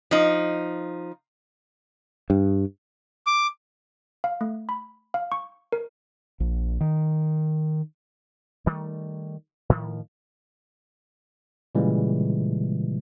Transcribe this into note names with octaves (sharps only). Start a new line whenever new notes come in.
F3 D#4
G2
D6
F5
A3
B5
F5
C#6
A#4
A#1
D#3
D#3 G3 A3
A2 D#3 F3
A#2 C#3 E3 G3 G#3